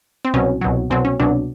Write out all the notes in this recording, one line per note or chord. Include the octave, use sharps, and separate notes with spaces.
C4
C2 B2 F#3 C#4
C2 B2 F#3
C2 B2 F#3 C4
C#4
C2 B2 F#3 D4